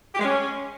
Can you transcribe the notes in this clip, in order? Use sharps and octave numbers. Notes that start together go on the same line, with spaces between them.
G4
G#3
C#4